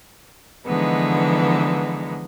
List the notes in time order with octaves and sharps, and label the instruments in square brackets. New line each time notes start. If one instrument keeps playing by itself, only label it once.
[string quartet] D3 E3 F3 G#3 B3 D#4